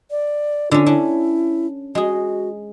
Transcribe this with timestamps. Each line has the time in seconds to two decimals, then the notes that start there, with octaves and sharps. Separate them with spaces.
0.11 D5
0.71 D3 C#4 F4
0.86 C#4 D4 E4
1.95 G#3 F#4 G#4